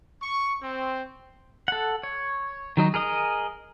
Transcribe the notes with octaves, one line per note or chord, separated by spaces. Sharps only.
C#6
C4
A4 F#5
C#5
D#3 F#3 D#4
G#4 A#4 D#5 D#6